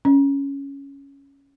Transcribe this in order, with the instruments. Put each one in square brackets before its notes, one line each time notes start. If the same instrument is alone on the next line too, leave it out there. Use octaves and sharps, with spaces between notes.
[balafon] C#4